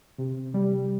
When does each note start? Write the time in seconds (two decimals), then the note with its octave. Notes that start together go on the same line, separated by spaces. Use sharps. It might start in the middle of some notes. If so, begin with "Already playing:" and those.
0.18 C3
0.54 G3